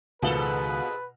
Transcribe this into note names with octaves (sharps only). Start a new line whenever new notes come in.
C#2 G#2 B2 D#3 F4 A4 B4 F#7